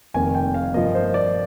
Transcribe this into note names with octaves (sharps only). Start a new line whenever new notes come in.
F1 F2 D#3 A#3 G#5
G5
F5
G2 F3 A#3 D#5
C5
D5